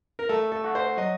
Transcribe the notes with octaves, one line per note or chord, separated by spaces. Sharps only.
A#4
A3 A4
A4
F#4
C5
F#3 D#5